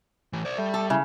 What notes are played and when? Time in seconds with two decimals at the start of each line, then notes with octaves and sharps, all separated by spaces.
0.33 A2 E3
0.45 C5 D5
0.58 G3 A3
0.74 A4
0.90 C#3 E4